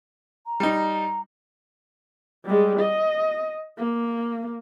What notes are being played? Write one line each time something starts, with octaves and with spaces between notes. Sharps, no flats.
A#5
G3 D#4
G3 G#3
D#5
A#3